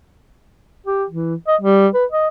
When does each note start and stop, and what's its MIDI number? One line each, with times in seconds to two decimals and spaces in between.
0.86 1.04 67
1.10 1.35 52
1.47 1.56 75
1.61 1.88 55
1.94 2.05 71
2.12 2.28 75